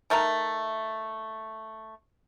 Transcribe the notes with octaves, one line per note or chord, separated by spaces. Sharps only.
D#3 A3 A#4 A#5